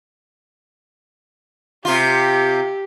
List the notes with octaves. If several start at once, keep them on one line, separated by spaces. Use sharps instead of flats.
C3 F4 G4